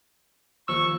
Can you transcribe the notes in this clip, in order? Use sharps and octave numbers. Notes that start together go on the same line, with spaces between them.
D#2 F3 C#6 E6